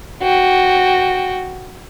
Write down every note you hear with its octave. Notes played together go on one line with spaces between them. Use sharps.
F#4 G5